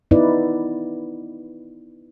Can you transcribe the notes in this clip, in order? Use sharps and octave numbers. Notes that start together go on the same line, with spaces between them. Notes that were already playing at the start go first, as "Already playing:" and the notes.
B3 D#4 E4 B4 D5